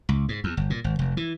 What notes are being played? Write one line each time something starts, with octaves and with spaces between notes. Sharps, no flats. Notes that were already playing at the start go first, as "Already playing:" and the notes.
C#2
G#2
E2
G1
A#2
G#1
F1
E3